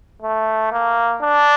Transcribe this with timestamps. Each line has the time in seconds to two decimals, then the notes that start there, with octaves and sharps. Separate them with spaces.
0.22 A3
0.72 A#3
1.22 D4